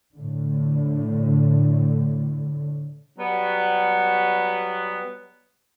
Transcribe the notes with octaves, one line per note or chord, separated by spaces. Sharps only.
A2 D3
F#3 G3 B3